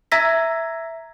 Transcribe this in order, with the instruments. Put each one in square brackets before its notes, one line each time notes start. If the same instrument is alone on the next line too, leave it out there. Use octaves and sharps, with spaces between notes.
[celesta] E5 A#5 E6 G#6 A#6 B6